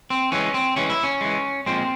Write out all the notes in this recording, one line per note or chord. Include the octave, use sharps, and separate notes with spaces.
C4
E3 G#3 C#4
C4
E3 G#3 C#4
E4
C#4
E3 G#3
A#2 F3 G#3 C4